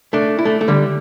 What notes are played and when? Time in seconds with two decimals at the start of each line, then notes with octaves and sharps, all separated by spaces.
0.13 A3 D4
0.39 E4
0.45 A3 D4
0.61 A3
0.68 D3 G3